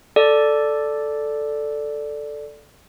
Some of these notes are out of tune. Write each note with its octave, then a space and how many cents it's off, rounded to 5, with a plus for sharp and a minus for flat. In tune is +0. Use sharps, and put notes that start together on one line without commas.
A4 +0 D5 +0